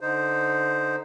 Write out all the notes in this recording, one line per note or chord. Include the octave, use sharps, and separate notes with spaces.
D3 D#4 C5